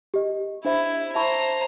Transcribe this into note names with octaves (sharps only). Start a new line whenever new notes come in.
G4 D#5
D4 E4 C5 E5
C5 E5 A5 A#5 C#6